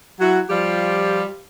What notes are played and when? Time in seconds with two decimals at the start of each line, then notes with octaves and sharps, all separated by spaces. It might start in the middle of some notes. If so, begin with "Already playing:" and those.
0.20 F#3 E4 F#4
0.50 F3 G3 F4 G4